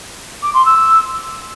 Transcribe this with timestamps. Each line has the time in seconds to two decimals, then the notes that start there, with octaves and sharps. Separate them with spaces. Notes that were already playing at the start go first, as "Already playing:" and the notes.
0.42 D6
0.54 C6
0.65 E6